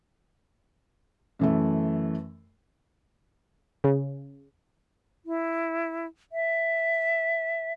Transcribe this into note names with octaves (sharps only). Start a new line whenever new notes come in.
F#2 E3 A3
C#3
E4
E5